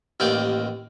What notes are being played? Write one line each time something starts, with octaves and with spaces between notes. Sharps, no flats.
A1 D#2 A#3 D5 G5